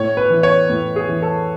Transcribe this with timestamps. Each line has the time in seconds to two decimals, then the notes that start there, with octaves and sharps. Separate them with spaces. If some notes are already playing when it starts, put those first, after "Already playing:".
Already playing: A2 C#5
0.17 B4
0.30 E3
0.43 C#5
0.70 A2
0.96 G#4
1.09 E3
1.22 A4